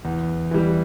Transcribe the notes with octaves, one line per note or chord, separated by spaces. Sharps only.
E2
E3 G3